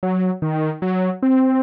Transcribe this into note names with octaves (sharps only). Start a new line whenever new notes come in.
F#3
D#3
F#3
C4